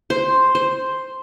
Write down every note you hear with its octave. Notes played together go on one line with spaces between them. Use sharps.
C5
C5